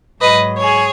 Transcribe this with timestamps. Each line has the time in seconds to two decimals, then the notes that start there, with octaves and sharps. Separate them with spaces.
0.20 G#2 F#3 B4 D#5
0.59 G#4 C#5